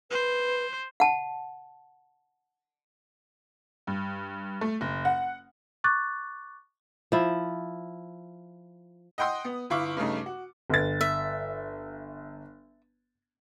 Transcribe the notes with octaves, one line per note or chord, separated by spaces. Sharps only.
B4 C5
F#5 A5
G2
A3
F#1
F#5
C#6 D6 F#6 A6
F3 E4
D#5 F#5 G5 C6 D#6
B3
G1 E4 F5 C#6 D6
G2 C#3 A3 D#4
F#4
G1 A6
E5